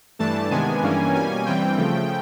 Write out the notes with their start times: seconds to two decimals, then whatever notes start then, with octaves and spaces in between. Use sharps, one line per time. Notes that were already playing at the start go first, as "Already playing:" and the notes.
0.19 G2 E3 A3 D4 A5
0.51 C3 D#3 G#3 B3 D4 G#5
0.82 G2 E3 G3 A#3 C#4
1.14 B2 G3 A#3 C#4 G#5
1.46 G2 E3 G3 C4 G5
1.78 C#3 F3 A3